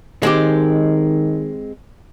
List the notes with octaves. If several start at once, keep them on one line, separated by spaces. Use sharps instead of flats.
D#3 G#3 C4 G4